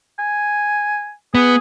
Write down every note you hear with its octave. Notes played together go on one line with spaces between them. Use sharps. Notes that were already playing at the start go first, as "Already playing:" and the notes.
G#5
B3 G#4